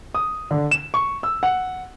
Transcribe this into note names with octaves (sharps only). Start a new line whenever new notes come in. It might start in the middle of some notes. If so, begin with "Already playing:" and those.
D#6
D3
E7
C#6
E6
F#5